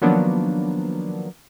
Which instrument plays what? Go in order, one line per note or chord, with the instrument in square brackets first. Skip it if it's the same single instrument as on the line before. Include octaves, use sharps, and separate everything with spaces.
[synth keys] D#3 F3 F#3 A#3 B3 D4